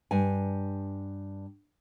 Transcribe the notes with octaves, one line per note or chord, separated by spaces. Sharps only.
G2 G#5